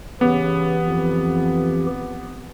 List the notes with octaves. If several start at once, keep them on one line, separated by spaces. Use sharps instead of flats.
C#3 E3 B3 G4
F2